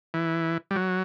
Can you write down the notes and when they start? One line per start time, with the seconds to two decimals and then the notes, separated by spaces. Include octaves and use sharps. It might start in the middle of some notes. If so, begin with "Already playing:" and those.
0.14 E3
0.71 G3
0.76 F#3